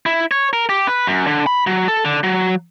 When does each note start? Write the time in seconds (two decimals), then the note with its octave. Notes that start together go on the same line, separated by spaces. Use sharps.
0.06 E4
0.31 C#5
0.53 A#4
0.69 G4
0.87 B4
1.07 F#2
1.27 D3
1.47 B5
1.67 F#3
1.88 A4
2.05 D3
2.24 F#3